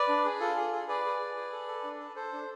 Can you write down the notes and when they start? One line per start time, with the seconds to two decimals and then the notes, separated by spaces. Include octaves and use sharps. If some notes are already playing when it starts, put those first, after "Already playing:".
Already playing: B4 D5
0.08 D4
0.25 G#4
0.40 F4 A4
0.57 G#4
0.72 G#4
0.88 G#4 B4 D5
1.04 G#4
1.20 G#4
1.36 G#4
1.52 A4
1.68 A4
1.84 D4
2.00 A4
2.16 A4 C5
2.32 D4